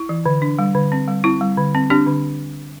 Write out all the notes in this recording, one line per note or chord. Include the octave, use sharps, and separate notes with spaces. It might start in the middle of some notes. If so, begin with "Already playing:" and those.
Already playing: E4
E3
D3
D4
G3
D3
C4
G3
C4 E4
G3
D3
C4
C4 D4 G4
D3